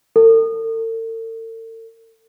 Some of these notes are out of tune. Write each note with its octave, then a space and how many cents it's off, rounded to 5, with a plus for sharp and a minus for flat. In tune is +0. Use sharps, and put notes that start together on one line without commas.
A4 +45